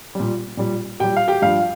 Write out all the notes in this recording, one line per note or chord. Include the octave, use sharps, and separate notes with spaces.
A#2 G3
A#2 G3
A#2 G3 G4 G5
F5
G4 G5
G2 F3 F5